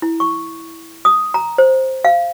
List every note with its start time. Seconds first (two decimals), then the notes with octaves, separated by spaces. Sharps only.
0.02 E4
0.20 C#6
1.05 D#6
1.34 A#5
1.58 C5
2.05 F5